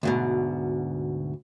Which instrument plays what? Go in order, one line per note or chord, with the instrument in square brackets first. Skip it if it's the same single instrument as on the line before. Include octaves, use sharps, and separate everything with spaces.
[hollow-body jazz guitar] D2 G#2 B2